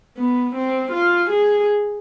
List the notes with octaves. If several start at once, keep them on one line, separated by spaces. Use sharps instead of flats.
B3
C4
F4
G#4